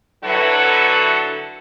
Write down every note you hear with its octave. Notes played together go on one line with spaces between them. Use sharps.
D3 F#3 E4 F#4 A4 B4